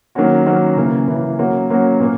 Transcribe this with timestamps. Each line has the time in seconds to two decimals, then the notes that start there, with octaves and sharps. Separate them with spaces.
0.15 D#3 F#3 A#3 C#4 F#4
0.46 D#3 F#3 A#3 C#4 F#4
0.76 C#3 E3 A#3
1.08 C#3 E3 A#3
1.39 F#3 A#3 C#4 F#4
1.70 F#3 A#3 C#4 F#4
2.00 A#2 A#3